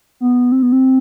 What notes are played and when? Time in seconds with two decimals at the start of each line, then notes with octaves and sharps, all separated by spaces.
0.21 B3
0.52 C4
0.62 B3
0.72 C4